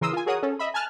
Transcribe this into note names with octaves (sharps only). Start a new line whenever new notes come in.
C#3 E3 A#4 C6 D#6 E6
F4 G#5
F#4 G#4 A#4 C#5 F#5 D#6
C#4 A4
D#5 E5 B5
G#5 A5 F6 F#6